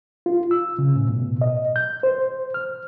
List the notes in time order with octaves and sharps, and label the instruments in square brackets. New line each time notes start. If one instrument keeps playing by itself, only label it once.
[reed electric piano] F4
E6
C#3
A2
B2
D#5
G6
C5
F6